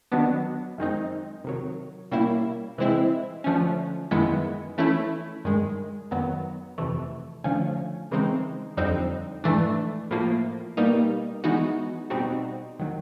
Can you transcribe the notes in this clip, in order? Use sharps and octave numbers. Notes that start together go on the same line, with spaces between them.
D#3 F#3 B3 D4
F#2 D#3 G#3 C4 D#4
C3 D#3 F#3
B2 G3 A#3 C#4 E4
C3 E3 G#3 C4 E4
D3 F3 A3 C#4
F#2 D#3 G#3 B3 E4
E3 A3 C#4 E4
G2 D#3 G#3
F#2 D#3 F#3 B3
F2 C3 E3 A3
D3 F3 A3 C#4
C#3 E3 G#3 C4 D#4
F2 D3 G3 C4 D#4
G#2 E3 A3 D4
A2 F3 A#3
B2 G3 A#3 D#4
E3 G#3 B3 D#4 F#4
B2 G3 C4 D#4 F#4
D#3 F#3